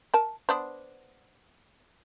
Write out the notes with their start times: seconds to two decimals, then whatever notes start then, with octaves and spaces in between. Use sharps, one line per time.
0.14 A#4 A5
0.49 B3 D4 C5